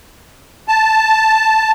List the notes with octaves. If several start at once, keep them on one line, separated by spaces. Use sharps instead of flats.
A5